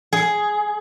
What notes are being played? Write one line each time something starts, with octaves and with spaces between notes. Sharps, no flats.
G#4